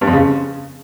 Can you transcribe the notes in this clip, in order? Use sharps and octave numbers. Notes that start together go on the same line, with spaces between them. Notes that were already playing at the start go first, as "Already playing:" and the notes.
G2
F2
C#3